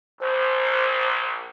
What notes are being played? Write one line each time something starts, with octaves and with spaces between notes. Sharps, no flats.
A#1 C5